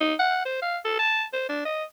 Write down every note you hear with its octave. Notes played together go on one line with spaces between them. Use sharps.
D#4
F#5
C5
F5
A4
A5
C5
D4
D#5